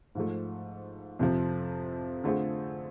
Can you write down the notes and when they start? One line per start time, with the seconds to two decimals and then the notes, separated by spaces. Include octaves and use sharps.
0.15 G#2 F3 A3
1.19 F2 C3 F3
2.24 D3 A3 C4 F4 G#4